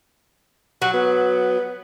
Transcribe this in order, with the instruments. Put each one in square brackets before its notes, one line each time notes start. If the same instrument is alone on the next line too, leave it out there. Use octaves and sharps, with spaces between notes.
[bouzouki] F#3 [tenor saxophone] F#4
[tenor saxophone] B3